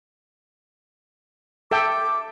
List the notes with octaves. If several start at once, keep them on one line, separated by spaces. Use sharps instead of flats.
A4 E5 G5 D6